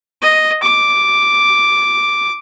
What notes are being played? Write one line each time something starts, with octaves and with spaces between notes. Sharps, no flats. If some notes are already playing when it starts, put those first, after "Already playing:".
D#5
D6